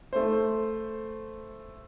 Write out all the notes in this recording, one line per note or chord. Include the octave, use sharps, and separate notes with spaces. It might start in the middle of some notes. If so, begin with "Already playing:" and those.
A3 C5